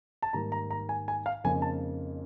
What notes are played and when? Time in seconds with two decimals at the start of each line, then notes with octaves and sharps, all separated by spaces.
0.22 A5
0.33 G#2 D#3 G3 A#3 A#5
0.52 A#5
0.71 A#5
0.89 G#5
1.08 G#5
1.26 F5
1.44 F2 C#3 F3 A#3 D#4 G#5
1.62 A5